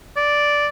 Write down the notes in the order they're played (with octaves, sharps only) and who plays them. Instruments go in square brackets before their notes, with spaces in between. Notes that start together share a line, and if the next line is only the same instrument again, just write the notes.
[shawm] D5